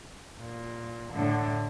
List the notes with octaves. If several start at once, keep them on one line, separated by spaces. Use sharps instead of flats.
A#2
A2 D3